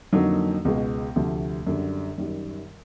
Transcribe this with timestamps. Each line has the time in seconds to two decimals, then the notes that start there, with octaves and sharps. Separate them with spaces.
0.13 F2 D3 F#3 A#3 D#4
0.65 C#2 B2 G#3
1.16 D2 C3 F3
1.67 F#2 D3 G3
2.18 F#2 D#3 G3